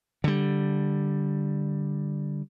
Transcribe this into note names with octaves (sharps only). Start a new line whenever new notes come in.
D3 G3